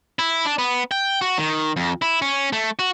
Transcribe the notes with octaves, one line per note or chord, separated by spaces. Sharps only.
E4
D4
B3
G5
F#4
D#3
F2
E4
C#4
A3
F#4